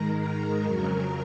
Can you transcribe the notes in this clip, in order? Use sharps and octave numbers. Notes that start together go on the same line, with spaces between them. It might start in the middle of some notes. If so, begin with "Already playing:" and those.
Already playing: G#2 D#3 G#3 A#4 A#5
A#4 A#5
F2 C#3 F#3 A#4 A#5